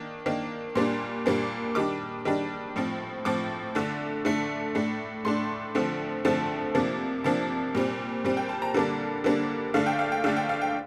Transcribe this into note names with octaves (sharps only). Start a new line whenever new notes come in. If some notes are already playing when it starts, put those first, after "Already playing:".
Already playing: D#3 A#3 D4
D#3 A#3 D4
A#2 G3 A#3 D4 C6
A#2 G3 A#3 D4
D#3 G3 D4 D6
D#3 G3 D4
A2 F3 C4
A2 F3 C4 D6
D3 A3 D4
D3 A3 D4
A2 A3 D4
A2 A3 D4 C6
D3 F3 A3 C4
D3 F3 A3 C4 A5
C3 F3 A#3 D4
C3 F3 A#3 D4 A5
A#2 G3 C4
A#2 G3 C4
G5
A5
A#5
D3 G3 A#3 D4 A5
D3 G3 A#3 D4
D3 A3 D4 F5
G5
F5
G5
D3 A3 D4 F5
G5
F5
G5